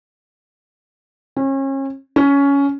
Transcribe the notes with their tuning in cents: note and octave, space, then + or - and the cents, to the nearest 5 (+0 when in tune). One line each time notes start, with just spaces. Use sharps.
C#4 -35
C#4 +15